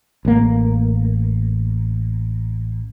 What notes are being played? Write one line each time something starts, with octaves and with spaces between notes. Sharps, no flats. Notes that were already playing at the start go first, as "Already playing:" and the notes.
A1 A#3